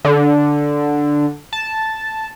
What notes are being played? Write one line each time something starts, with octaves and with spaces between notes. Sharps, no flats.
D3
A5